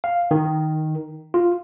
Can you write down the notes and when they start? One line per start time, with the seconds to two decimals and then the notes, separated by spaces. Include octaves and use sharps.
0.04 F5
0.31 D#3
1.34 F4